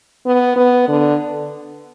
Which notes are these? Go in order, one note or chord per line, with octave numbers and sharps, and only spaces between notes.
B3
B3
D3